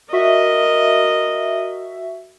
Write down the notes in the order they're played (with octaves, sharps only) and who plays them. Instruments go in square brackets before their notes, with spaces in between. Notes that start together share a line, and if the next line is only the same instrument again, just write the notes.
[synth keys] F#4 E5 [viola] A#4 D#5